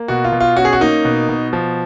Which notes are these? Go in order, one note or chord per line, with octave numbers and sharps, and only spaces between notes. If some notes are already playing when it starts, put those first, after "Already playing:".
Already playing: A#3
B2 F#4
F4
B2
F4
C#4 F#4
G#4
F#4
A#3 D#4
B2
B2
F3